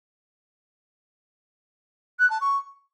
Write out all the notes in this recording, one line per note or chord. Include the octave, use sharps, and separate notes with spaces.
F#6
A5
C#6